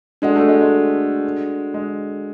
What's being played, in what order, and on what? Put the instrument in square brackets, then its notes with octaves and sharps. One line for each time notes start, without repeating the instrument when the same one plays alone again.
[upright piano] G#3 [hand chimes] D4 F#4 A4 D5 F#5
[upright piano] A3
G#3
G#3
G#3